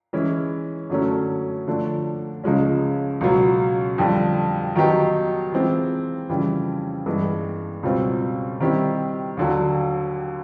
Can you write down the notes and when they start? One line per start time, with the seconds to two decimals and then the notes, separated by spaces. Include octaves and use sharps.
0.13 E3 G#3 C#4 E4
0.90 F#2 D3 F#3 A3 C#4
1.67 D3 F3 A3 D4
2.44 C#2 C#3 F3 G#3 C#4
3.21 C#2 B2 F#3
3.98 F2 D3 G3
4.76 D#3 F#3 B3 D#4 G4
5.52 E3 G#3 C4 F4
6.29 F2 C#3 E3 G3
7.06 G2 E3 G#3 B3
7.83 C#2 B2 G3 C4 F4
8.60 D#3 G3 C4 E4 G4
9.37 D#2 D3 F#3